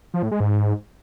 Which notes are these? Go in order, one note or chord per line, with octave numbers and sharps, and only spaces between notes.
F3
A2
G#3
G#2